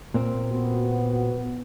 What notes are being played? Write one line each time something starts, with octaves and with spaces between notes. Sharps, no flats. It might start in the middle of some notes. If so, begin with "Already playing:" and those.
A#2 A#3 C4
B3 F#4